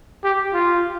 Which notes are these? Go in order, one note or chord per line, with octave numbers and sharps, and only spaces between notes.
G4
F4